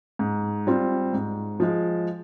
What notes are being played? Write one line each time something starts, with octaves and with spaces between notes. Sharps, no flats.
G#2
G3 C4 F4
G#2
F3 G#3